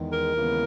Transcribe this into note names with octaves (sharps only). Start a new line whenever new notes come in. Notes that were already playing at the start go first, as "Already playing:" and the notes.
Already playing: E2 D#3 G#3
A#4
D#2 C#3 E3 G#3 B3